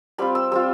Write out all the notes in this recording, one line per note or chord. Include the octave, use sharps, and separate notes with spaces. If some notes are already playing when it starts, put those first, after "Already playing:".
G3 C4 F4 B5
E6
G3 C4 F4 E6